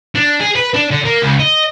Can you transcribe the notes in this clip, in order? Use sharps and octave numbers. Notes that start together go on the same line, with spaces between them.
D4
G#4
B4
D4
D3
A#3
C#2
D#5